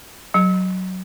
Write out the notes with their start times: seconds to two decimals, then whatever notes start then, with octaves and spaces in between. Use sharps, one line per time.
0.34 F#3